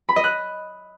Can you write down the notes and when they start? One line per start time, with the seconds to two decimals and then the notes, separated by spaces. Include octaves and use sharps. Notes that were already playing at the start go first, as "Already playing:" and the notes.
0.09 B5
0.16 D#5
0.24 F#6